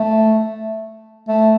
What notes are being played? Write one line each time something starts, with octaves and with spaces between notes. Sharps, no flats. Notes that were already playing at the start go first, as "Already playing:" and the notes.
Already playing: A3
A3